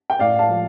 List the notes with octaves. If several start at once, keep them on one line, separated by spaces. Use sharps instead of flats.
G5
A2 D5 F5
F5 A5
F3